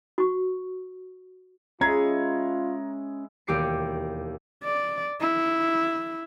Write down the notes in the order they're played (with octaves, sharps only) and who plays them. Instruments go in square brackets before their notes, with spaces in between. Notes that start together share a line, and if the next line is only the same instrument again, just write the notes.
[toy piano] F#4 C#6
[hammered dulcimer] G#3 E4 G#4 [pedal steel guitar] C#4 C6 [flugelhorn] F4 [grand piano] A#5 G#6
[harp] E1 D#2 G4 D6 C7 C#7
[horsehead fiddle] D5
E4